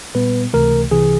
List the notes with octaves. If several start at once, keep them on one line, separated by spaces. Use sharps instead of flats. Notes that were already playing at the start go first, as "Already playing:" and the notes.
A#2 G3 B3 B4
C#2 C3 E3 A3 A#4
C2 C3 E3 G#4